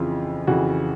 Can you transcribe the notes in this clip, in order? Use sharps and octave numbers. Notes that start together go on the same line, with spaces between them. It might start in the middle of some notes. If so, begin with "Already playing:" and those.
Already playing: F2 C#3 E3 F4
F2 C#3 E3 F#4